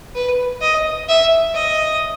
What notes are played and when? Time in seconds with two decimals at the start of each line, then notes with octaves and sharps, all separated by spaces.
0.15 B4
0.61 D#5
1.08 E5
1.54 D#5